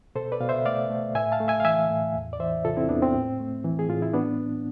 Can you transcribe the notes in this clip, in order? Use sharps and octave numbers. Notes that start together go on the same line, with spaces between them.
B2 A4 C5
B4 D5
B2 F5
C5 E5
A3 D5 F5
A3
A2 E5 G#5
F5 A5
A3
E5 G#5
F5
E3 E5 G#5
A2
E2
D5
E3 C5 E5
C3 F4 A4
C4 E4
E2 B3 D4
C4
A2
A3
E3
G#4
A2 F4
E4
B3 D4